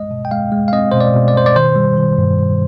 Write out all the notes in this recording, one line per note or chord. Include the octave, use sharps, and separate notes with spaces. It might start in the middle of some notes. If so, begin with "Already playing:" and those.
Already playing: G#3 D#5
B2
G5
G#3 F5
G#3
F5
C4 D#5
B2 C5
D5
B2
D5
B2 C5
D5
D#3 C5
G3
D#3
G2
G2